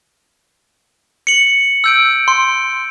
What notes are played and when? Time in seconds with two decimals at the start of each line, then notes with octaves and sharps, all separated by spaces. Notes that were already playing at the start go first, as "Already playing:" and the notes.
1.27 C#7 F#7
1.84 E6 G6 D7
2.28 C6